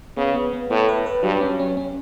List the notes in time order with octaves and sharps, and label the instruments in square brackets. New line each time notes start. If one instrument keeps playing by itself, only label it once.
[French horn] C#3 [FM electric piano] B3
[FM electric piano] B3
B3
[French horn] A2 [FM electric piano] B3
[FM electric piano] B4
B4
[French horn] G2 [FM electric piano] F#3
[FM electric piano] C#4
C#4
C#4